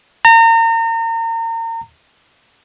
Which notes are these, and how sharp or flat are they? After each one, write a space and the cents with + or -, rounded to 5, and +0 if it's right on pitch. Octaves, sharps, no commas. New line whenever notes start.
A#5 -35